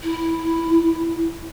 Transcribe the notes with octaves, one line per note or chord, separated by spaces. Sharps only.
E4